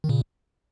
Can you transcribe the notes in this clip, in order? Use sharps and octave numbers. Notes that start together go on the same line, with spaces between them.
D#3
A#2 C#3